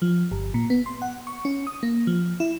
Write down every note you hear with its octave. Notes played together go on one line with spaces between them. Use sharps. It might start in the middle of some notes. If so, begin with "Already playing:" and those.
F3
G1
A#2
B3
C6
F#5
C#6
C#4
D#6
A#3
F3
E4